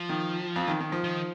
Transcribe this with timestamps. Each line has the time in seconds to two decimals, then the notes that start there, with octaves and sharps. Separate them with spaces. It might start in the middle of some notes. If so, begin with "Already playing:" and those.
Already playing: F3
0.09 D#3
0.56 F2
0.68 D#3
0.80 D#3
0.92 F3
1.04 D#3